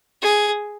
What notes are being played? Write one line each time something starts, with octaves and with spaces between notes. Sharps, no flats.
G#4